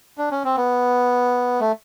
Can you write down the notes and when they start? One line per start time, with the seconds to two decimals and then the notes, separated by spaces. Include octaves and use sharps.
0.18 D4
0.31 C#4
0.44 C4
0.57 B3
1.60 A3